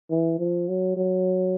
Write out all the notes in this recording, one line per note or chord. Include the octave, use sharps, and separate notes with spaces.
E3
F3
F#3
F#3